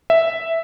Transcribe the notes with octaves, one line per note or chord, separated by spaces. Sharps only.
E5